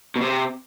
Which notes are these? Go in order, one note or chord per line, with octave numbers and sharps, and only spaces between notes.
B2
C3